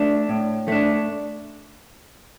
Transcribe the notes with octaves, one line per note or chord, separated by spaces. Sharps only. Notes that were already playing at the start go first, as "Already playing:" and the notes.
Already playing: A3 D4
A2
A3 D4